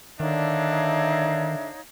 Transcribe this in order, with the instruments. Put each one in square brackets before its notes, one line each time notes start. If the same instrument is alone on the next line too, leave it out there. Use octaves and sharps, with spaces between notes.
[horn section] D3 D4 [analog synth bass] D#3 [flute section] D#4 C#5 F5 [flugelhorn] E5